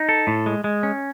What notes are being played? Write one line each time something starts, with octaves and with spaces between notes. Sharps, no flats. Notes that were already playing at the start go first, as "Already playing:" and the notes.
Already playing: D#4
A4
A2
G#3
G#3
C#4